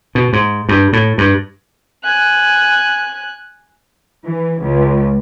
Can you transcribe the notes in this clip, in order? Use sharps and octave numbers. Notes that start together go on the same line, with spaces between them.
B2
G#2
G2
A2
G2
G#5 F#6
E3
C#2